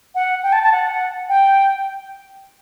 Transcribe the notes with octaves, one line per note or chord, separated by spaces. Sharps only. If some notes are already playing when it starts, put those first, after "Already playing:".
F#5
G5
A5
A5
F#5
G5